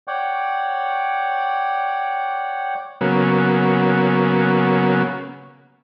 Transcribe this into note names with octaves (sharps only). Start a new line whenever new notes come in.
C#5 D5 F#5 G5
C#3 F#3 A#3 B3